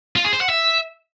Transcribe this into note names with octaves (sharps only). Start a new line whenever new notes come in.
F4
G#4
C5
F#5
E5